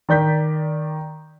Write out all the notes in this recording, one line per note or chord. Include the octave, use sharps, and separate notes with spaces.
D#3 D5 G6 B6